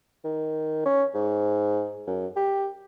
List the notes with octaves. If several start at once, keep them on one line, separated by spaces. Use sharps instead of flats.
D#3
C#4
G#2
F#2
G4